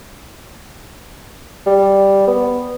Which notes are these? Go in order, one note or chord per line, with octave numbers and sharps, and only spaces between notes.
G3
B3